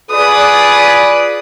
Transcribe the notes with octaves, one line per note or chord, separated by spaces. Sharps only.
F4 G#4 B4 D5 D#6